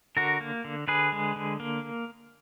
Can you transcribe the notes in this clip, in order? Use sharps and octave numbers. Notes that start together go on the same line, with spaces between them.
D3 F#4 A#4
A#3
D3
D3 G#4 B4
G#3
D3
A#3